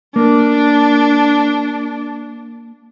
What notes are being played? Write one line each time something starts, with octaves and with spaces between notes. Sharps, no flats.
A#3 D4